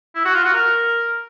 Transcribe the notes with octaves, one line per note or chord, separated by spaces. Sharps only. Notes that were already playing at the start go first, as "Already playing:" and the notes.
E4
F#4
F4
F#4
A#4